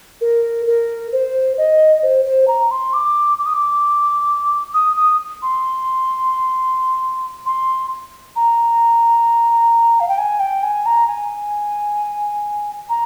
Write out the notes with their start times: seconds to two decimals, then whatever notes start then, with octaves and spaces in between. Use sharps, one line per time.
0.21 A#4
0.67 A#4
1.12 C5
1.58 D#5
2.03 C5
2.25 C5
2.48 A#5
2.71 C6
2.93 D6
3.39 D6
3.46 D#6
3.54 D6
4.74 D#6
4.96 D#6
5.42 C6
7.46 C6
8.36 A#5
10.00 F5
10.08 G5
10.18 G#5
10.40 G5
10.63 G#5
10.86 A#5
11.08 G#5
12.89 A#5